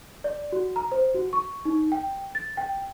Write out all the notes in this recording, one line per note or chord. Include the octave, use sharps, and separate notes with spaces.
D5
F#4
A#5
C5
F#4
C#6
D#4
G5
A6
G5